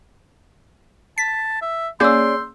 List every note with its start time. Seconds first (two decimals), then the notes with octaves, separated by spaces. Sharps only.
1.18 A5 B6
1.62 E5
2.00 A#3 C#4 G#4 D5 C6 E6 G6